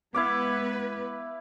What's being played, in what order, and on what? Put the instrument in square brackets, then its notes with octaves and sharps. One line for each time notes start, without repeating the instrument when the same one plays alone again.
[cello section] G#3 B3 B4 [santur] E4 F5 D6